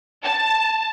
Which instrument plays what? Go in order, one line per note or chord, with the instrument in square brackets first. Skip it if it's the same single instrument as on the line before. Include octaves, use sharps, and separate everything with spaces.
[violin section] A5